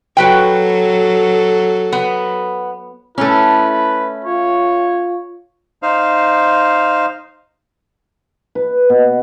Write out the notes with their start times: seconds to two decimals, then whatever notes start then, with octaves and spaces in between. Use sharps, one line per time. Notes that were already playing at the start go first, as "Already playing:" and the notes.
0.17 F#3 F#4 A4 B4 G5
1.92 B3
3.18 A3 C#4 E4 B4
4.25 F4 C#5
5.82 D#4 C5 F5
8.55 B4
8.90 B2